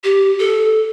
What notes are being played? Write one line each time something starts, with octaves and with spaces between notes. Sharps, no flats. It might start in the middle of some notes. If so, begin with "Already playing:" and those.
G4
A4